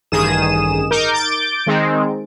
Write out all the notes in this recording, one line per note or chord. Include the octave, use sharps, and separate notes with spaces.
A1 G2 D#3 G#4 D#6 E7
D#4 A#4 D6 G6
D6 G6 A6 D7
D#3 G#3 C4 D#4